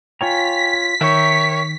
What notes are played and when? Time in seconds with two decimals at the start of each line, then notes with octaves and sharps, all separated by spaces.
0.21 F4 C#5 G5 G#5 A#5 B6
1.01 D#3 A#4 C#5 E5 G5